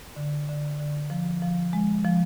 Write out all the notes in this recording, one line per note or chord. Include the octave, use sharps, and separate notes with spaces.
D3
D3
D3
F3
F3
G#3
F3